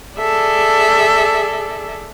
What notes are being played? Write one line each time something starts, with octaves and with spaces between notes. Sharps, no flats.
G#4 A4 D5 E5